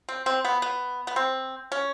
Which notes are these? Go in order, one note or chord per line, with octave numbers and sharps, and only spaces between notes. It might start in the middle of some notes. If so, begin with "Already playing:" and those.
C4
C4
B3
B3
B3
C4
C#4